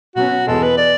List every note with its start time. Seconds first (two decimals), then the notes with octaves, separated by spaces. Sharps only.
0.16 B2 F#3 C#4 F#4
0.47 E2 B2 G#3 A4
0.62 B4
0.77 D5